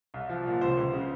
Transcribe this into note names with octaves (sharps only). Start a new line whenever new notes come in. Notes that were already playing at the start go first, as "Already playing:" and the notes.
C2
F3
A#2
C#2 C5
C#2
C#3